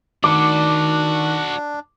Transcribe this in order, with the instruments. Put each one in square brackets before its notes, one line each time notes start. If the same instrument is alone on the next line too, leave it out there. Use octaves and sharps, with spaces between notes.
[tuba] D#3 [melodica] D4 [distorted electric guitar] F#4 D5 [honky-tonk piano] D6